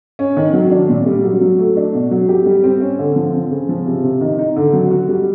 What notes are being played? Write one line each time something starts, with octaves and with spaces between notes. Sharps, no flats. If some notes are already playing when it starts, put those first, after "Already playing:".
C#4
D#3
F#3
D4
A#2
G3
F#3
F#3
A3
D4
B2
F#3
G4
G3
C4
C#4
D3
F3
C4
C#3
F3
C3
C3
D#3
D#4
D3
F#3
F#4
G3